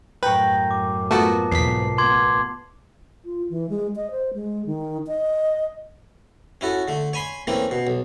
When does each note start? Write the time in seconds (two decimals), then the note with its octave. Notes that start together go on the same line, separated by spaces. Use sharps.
0.23 F#2 A2 B4 G5 A#5 C#6
0.71 D6
1.11 A3 B3 F4 F#4 A#4 A5
1.52 B1 E2 G#2 B6 C7
1.98 A1 B3 C6 D6 G#6
3.25 F4
3.50 E3
3.70 G#3
3.96 D#5
4.11 C5
4.34 G#3
4.66 D#3
5.07 D#5
6.61 C#4 E4 F#4 A4
6.88 D3 A3
7.13 C#5 G#5 B5 C6
7.47 E3 A3 A#3 C4 C#4
7.71 B2
7.87 B1